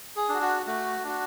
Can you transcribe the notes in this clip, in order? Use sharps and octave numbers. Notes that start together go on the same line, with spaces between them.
G#4
D4 F#4
F#4
A3 F#4
D4 F#4